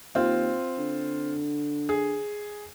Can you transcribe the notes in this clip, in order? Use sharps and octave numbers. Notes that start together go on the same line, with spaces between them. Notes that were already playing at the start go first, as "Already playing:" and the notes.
D#2 C4 F4
D3
G#4